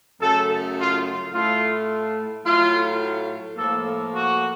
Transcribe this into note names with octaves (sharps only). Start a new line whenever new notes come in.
F#2 C#3 A3 A4
F4
A2 A3 F4
A2 F#3 A3 F4
A2 F3 A#3 A4
F#4